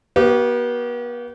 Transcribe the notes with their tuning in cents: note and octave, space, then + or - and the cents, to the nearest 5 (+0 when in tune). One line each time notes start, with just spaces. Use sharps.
B3 -40 G4 -40 F5 +0